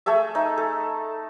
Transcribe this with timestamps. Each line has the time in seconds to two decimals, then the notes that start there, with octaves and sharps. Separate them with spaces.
0.06 A3 G#4 A4 E5
0.35 D#4 E5
0.58 A4